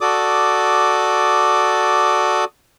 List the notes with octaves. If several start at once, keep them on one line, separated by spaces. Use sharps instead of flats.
F#4 A4 D5 D6 D#6